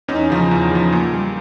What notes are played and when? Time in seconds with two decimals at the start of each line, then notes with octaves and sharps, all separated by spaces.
0.08 E2 C#4 D#4
0.30 C#3 F3
0.51 E2
0.72 C#3 F3
0.92 A#2
1.14 G3